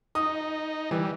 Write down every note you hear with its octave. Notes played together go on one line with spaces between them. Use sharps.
D#4 D#6
E3 G3